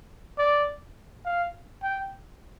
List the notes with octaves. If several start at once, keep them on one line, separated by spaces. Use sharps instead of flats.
D5
F5
G5